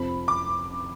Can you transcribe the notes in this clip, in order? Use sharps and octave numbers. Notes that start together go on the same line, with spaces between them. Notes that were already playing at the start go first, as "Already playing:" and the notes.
Already playing: F1 F2 F3 B5
D6